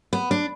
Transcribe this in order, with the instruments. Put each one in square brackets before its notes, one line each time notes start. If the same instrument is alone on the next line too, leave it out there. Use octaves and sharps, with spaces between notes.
[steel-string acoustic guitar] B3
D4